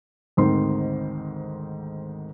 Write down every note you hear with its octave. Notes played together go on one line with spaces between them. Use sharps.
G#1 D2 G#2 D#3 C4 C6